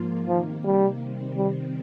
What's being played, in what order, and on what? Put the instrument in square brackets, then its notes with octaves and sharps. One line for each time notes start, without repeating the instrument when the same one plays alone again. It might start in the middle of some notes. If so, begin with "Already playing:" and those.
Already playing: [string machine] G#2 F3 A#3 F4
[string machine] C3 D#3 A#3 [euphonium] F3
[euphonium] G3
[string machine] C3 D#3 G3 C4
[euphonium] G3